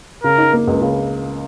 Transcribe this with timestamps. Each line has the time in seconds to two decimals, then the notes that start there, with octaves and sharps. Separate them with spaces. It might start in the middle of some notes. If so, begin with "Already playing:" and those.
0.23 C#3 A#4
0.38 D#4
0.53 A#3
0.67 C#2
0.82 C#3